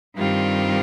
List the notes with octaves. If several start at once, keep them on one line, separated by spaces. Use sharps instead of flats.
G2 D#3 G3 C4 F4